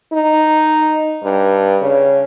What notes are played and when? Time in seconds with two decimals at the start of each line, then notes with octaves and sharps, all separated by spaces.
0.13 D#4
1.24 G2
1.82 C#3